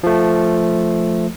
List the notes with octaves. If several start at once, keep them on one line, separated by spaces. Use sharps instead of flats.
F3 A3